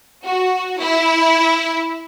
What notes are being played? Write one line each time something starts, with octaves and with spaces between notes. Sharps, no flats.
F#4
E4